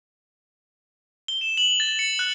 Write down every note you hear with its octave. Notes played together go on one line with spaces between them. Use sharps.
G7
E7
F#7
A6
C#7
F#6